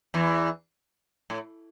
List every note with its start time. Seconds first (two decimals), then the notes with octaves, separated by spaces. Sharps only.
0.14 E2 E3
1.30 A2